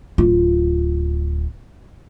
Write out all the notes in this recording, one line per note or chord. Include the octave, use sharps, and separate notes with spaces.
D1 F4